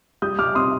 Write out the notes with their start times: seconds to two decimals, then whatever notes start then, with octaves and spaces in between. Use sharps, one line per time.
0.22 G3 D#6 G6
0.39 G3 D6 F6
0.55 C3 C6 D#6